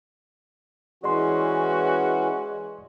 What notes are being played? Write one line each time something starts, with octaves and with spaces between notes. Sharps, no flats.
E3 G#3 C#4 F#4 D5 C6